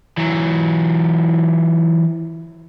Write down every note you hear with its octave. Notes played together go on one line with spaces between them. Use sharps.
E3 F#3